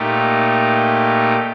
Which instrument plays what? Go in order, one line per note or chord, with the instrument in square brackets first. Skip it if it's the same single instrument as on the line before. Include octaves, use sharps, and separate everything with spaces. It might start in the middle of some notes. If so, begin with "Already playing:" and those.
Already playing: [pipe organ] A#2 A3 D#4 G4